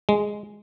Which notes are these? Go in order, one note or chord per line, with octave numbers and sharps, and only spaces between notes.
G#3